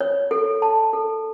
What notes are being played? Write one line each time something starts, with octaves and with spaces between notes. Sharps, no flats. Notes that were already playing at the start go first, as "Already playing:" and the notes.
C#5
A4
A5
A4